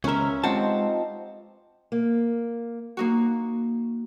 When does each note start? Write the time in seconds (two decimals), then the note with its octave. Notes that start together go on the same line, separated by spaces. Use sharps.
0.04 C#2 C#4 A#4 B4 E5
0.44 F3 G#3 C4 D#4 G4 F#5 A5
1.92 A#3
2.97 A#3 D#4 F#4